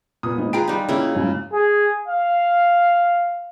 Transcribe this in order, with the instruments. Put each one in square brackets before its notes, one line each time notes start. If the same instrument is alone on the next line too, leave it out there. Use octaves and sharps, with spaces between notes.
[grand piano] A#2 B3 [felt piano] D#6
[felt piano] G#1 D#4
[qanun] F4 G#4 B4 [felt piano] G5 [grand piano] A#5 D7
[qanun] G3 D#4
[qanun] C#3 A#3 C#4 [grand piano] E4
[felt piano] G1 C#2 F#2
[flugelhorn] G#4
F5